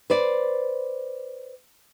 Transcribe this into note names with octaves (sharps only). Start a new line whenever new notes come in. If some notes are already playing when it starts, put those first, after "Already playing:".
B4 C5 D5